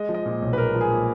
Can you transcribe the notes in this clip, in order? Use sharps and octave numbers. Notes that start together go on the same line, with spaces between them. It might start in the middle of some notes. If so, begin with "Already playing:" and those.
Already playing: G#3 D#5
F3
D#5
A#2
B1
B4
G#3 A#4
F3
G#4
A#2